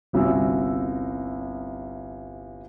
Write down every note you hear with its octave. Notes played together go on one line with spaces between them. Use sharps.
G1 C2 C#4 F#4 E6